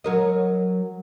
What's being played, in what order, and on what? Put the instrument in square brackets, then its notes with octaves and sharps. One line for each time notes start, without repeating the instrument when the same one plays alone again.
[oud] F#3 A#4 D#5